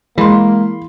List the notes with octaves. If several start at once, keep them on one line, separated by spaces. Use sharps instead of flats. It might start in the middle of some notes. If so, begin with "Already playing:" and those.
E3 G#3 A#3 B5 C6